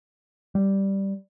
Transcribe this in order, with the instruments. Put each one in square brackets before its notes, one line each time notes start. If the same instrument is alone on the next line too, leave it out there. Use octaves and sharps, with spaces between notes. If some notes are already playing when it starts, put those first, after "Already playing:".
[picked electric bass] G3